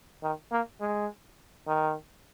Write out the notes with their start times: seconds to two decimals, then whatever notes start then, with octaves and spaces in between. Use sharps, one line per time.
0.23 D#3
0.52 A#3
0.81 G#3
1.67 D#3